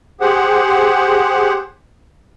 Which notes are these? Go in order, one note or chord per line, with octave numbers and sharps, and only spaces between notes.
G4 G#4 C5 F#5